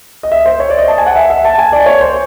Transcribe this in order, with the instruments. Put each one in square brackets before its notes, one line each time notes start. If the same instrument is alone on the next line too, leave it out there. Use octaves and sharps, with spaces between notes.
[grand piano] D#5
E5
C5
C#5
D5
D#5
A5
G#5
F#5
E5
E5
A5
G#5
D5
C#5
C5